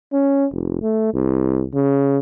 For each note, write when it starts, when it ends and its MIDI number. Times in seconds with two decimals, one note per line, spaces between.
0.13 0.45 61
0.52 0.81 29
0.82 1.13 57
1.14 1.65 36
1.73 2.18 49